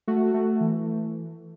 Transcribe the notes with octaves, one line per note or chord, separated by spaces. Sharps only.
A3 F#4
A3
E3